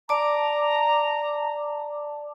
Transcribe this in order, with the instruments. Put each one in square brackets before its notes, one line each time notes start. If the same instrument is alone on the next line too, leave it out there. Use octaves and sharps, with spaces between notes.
[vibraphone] D5 A5 D6 [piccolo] A#5